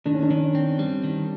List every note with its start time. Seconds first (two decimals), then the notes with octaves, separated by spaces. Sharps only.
0.05 D#3 D4
0.14 C#4
0.22 D4
0.30 D#3
0.55 C4
0.79 G3
1.04 D#3